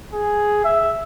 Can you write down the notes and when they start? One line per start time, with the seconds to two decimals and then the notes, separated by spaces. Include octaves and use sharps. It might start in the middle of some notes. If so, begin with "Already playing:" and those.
0.13 G#4
0.64 E5